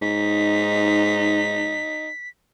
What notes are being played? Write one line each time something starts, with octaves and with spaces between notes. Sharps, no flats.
G#2 D#4 B6